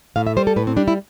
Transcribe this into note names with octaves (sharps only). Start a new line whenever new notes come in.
A2 F5
E5
G3 C5
A4
A2 B4
C4
G3 D4
E4